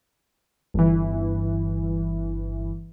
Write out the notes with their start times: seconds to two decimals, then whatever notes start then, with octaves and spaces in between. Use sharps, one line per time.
0.74 G1 E3